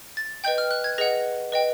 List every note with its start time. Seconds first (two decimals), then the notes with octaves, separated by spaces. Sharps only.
0.17 A6
0.44 B4 D#5 G5 G6
0.58 F6
0.71 F#6
0.84 G#6
0.98 G#4 B4 D#5 F#5 A#6
1.52 B4 D#5 G5